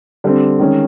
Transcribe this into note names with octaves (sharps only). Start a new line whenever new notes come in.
D3 G3 C4
D#3 G#3 C#4